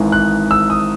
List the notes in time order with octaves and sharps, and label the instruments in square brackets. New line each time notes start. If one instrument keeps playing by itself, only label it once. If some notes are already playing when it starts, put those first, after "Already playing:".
Already playing: [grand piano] G#1 G#2 E3
F#6
E6
D#6